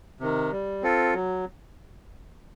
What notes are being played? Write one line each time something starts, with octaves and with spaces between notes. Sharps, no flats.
C3 D#3
G3
C4 F4 A4
F#3